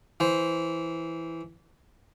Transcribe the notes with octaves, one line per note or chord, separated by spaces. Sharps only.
E3 C5